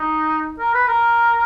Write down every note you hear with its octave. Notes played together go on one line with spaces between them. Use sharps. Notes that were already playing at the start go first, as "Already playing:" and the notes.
Already playing: D#4
A#4
B4
A#4